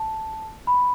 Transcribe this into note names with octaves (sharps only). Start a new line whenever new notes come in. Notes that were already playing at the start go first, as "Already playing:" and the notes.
Already playing: A5
B5